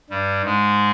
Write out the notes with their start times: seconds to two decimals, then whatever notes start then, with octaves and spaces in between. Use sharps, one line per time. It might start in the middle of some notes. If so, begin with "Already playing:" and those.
0.10 G2 G3
0.44 G#2 G#3